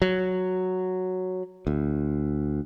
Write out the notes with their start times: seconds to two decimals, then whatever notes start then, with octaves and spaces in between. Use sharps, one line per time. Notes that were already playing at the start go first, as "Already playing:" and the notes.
0.02 F#3
1.67 D2